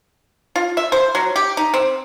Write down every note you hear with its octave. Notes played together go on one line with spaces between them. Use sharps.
F4
E5
C5
F#3
G4
D#4
C4